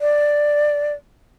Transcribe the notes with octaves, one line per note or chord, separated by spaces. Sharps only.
D5